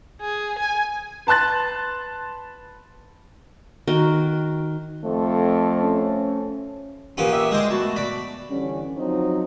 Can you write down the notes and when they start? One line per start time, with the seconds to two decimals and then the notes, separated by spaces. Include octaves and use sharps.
0.21 G#4
0.59 G#5
1.27 B4 A5 C6 F#6 A6
3.88 D#3 F#4 A#4 G5
5.05 F2 A3
5.82 C#4
7.18 A#2 E3 B3 C#4 G4
7.31 G4 E5
7.51 G#3 G#4 C5 D6
7.71 A3 B3 F#4 A5
7.96 D5 B5
8.50 D3 E3 G3 C#4
8.98 F3 F#3 C4 D#4